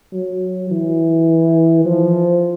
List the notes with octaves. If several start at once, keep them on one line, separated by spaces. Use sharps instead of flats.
F#3
E3
F3